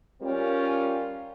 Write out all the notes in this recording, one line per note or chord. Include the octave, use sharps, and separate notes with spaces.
G3 C#4 F4 A#4